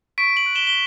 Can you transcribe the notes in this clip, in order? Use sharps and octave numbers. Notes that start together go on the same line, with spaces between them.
C#6 B6 D7
D7 F#7
F#6
E7 G7
G7